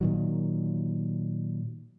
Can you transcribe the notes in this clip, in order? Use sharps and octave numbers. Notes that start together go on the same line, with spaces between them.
A#2 D#3 F#3